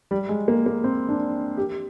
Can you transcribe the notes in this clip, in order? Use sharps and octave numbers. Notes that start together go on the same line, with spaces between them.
G3
G#3
A#3
A#3
C4
D4
G4